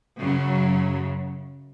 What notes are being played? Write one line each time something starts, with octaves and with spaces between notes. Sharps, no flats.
F#2 C#3 F#3